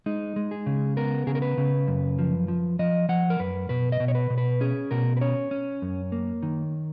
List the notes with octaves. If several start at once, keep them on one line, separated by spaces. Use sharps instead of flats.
G#3 D#4
G#3
G#4
C#3
B3 A#4
C#3 G#4
A#4
B4
C#3
F#2
F3
F3
F3 D#5
F3 F#5
A#4
F#2 B4
B2 B4
D#5
B2
C#5
B4
B2
B4
C#4 G#4
B2 A#4
B4
C#4 C#5
C#4
F#2
A#3
D#3